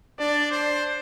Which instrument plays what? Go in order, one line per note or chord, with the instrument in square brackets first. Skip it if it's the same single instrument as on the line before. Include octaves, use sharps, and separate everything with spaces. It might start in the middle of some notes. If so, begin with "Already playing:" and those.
[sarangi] D4 [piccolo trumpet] D5
[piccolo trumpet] C5